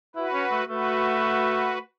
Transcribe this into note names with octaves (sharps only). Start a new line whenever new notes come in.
E4 F#4 B4
C#4
A3
A3 F#4 B4